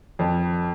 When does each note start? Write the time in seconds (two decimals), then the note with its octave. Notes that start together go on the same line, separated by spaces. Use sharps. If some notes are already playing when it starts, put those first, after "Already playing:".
0.19 F2